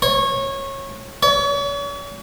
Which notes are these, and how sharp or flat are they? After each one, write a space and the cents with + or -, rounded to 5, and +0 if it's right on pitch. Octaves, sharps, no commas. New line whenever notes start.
C#5 -20
C#5 +40